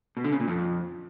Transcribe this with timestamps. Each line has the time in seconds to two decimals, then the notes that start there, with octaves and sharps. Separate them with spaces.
0.17 B2
0.24 D3
0.32 C#3
0.40 A#2
0.48 F2